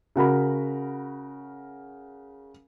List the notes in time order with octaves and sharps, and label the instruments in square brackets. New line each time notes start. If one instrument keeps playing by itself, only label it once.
[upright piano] C#3 F#4 A#4 B5